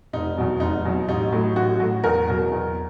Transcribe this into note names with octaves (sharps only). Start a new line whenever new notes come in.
F1 D#4
E2 B2 F#3
F1 D#4
E2 B2 F#3
A1 D#4
A2 F#3
A1 F#4
A2 F#3
E2 A#4
B2 F#3
E2